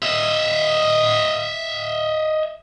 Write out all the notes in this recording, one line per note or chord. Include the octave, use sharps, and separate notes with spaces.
D#5 E5